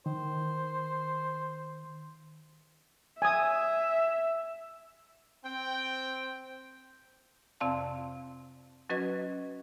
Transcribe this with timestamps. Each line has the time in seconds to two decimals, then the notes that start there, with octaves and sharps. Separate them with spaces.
0.06 D#3 C5
3.22 E5 G#5 D#6
5.45 C4 G5
7.60 F2 C3 C4 D5 F5 A5
8.90 F#3 C#4 F#4 B4 D#5 G#6